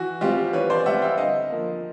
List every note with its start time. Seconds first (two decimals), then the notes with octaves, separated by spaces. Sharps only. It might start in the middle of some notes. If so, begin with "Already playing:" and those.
Already playing: E3 F#4
0.21 G3 C4 F4 G4
0.53 E3 B4 C#5
0.70 C5 D5
0.86 G3 C4 E5 F#5
1.02 F5 G5
1.17 D3 D#5 F5
1.50 F3 A#3